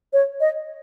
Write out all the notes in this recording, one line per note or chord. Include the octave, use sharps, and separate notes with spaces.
C#5
D#5